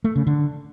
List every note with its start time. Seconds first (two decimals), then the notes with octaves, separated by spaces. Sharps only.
0.04 A3
0.16 C#3
0.27 D3